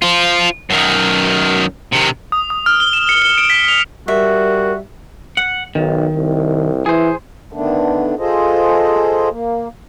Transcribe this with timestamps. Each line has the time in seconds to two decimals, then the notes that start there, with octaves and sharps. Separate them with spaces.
0.02 F4 C5
0.70 F#2 D#3
1.93 C3 D#3
2.32 D#6
2.50 D#6
2.66 F6
2.80 G7
2.93 E7
3.09 C#7
3.22 G7
3.38 D7
3.50 B6
3.68 F7
4.08 G3 F#4 A#4 E5
5.37 F#5
5.75 B1 D#3
6.15 C2
6.86 E3 G#4 C5
7.53 D3 D#3 A3 B3 D4
8.19 F4 G#4 A4 C5 D#5
9.29 A#3